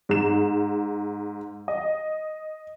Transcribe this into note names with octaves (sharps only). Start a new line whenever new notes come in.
G#2 E7
D#5